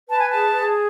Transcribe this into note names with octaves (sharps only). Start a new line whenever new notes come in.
B4 A5
G#5
G#4 A5
G#4